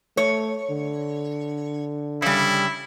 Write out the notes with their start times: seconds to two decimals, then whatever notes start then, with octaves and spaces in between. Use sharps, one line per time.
0.17 A3 C#5
0.71 D3
2.22 C#3 G3 E4